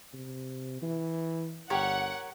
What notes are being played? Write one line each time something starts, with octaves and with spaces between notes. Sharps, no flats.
C3
E3
G1 G4 A#4 C#5 F#5